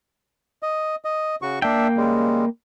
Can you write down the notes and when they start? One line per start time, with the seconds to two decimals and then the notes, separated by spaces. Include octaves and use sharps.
0.63 D#5
1.05 D#5
1.42 C#3 F#4 C#6
1.62 A#3 D4 E5 G5
1.97 C#3 G3 G#3